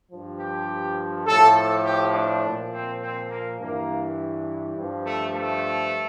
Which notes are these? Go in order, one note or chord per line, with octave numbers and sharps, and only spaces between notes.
G2 F3
G4
A2 F3 A4
A4
G4
D4
A#2 F3
C4
C4
A#3
G2 E3 A#3
G2 F3
A3
A3